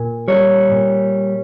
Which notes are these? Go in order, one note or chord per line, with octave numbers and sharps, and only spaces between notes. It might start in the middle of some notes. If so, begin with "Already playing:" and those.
Already playing: A#2
G3 C#5
A#2